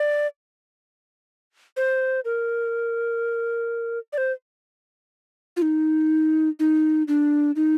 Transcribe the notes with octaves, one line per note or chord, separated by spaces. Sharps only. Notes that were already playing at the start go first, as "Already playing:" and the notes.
Already playing: D5
C5
A#4
D5
C5
F4
D#4
D#4
D4
D#4